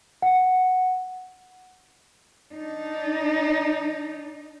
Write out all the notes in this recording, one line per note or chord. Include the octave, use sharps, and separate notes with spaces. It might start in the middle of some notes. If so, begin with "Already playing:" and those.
F#5
D4 D#4